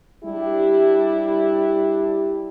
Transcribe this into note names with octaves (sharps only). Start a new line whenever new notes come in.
G3 D4 E4 G4